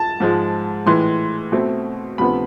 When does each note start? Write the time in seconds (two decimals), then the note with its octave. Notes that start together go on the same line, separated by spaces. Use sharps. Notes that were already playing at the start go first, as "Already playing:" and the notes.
Already playing: A5
0.20 G#2 F3 G#3
0.86 A2 E3 G#3 C6
1.52 B2 A3 C4
2.18 D2 C3 F3 B3 B5